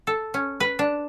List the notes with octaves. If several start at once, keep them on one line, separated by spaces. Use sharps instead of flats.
A4
C#4
B4
D4